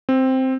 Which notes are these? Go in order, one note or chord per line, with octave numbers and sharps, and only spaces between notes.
C4